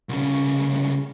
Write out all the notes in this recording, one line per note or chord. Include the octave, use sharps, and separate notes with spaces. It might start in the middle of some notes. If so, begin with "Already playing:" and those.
C2 C#3